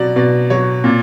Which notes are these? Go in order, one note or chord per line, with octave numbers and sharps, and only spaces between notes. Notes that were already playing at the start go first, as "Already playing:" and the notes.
Already playing: B2 F#3 D5
B2 D5
F#3 C#5
A#2